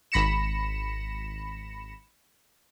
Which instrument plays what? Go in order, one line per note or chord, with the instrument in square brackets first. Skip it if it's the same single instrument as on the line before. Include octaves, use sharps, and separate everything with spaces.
[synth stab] G#1 B5 A#6 C#7 E7